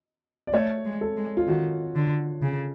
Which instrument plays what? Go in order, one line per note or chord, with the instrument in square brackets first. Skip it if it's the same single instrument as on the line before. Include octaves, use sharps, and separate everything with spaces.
[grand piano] D5
[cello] A3 [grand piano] C#5
[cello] G#3
[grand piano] A4
[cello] G#3
[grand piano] F4
[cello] D#3 [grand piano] F#4
[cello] D3
C#3